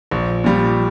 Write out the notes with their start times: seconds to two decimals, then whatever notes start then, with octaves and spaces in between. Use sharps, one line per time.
0.11 A#1
0.44 A#2 G3